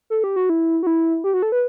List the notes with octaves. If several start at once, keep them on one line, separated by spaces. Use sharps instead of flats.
A4
G4
F#4
E4
F#4
E4
G4
F#4
A4
B4